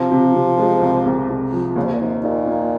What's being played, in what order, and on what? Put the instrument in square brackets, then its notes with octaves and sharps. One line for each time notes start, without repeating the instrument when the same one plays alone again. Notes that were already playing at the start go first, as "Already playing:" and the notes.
Already playing: [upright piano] C3 [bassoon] F3
[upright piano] C3
C3
G#3
C2
C2
C2
F3
[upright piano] D#2 [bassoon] C#3
[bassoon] C3
A#2
[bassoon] C3 [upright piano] D#4
[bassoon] A#2 [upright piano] D#4
[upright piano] A#3